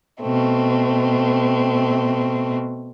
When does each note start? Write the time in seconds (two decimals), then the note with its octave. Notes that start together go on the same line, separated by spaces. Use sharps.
0.21 B2 A3 C4